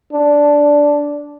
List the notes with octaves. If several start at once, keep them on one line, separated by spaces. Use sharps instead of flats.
D4